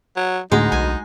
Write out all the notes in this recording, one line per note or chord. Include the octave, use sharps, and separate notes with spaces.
F#3
D2 A2 G#3 D#4
B1 G#5